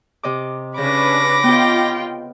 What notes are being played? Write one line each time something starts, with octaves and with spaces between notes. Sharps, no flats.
C3 D#5 D6
C#3 C#4 D4 B4 B5 D6 A#6
B3 F4 D#5 G5